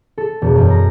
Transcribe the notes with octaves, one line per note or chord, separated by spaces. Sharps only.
A4
E1
F#2
A#5